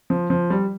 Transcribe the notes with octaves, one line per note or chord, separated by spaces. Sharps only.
F3
F3
G3